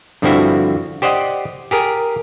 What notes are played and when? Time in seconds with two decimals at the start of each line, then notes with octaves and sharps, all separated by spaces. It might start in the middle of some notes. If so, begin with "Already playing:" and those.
0.22 G2 D3 F3 C4 E4 F#4
1.02 G4 C5 D5 D#5 F#5
1.71 G4 G#4 A#4